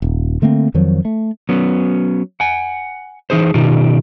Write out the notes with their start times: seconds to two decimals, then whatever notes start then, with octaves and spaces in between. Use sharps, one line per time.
0.02 D#1
0.42 D3 A3 A#3 C4
0.74 F2 D#3 F3 F#3
1.05 A3
1.49 F#3 B3 C#4
2.40 F#5 G#5
3.30 E3 D#4 G#4 C5
3.54 B2 D#3 D#4 F4 G4